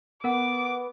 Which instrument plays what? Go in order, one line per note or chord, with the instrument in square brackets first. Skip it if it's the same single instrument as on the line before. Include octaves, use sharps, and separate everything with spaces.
[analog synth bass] B3 [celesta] A#4 F#5 [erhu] D6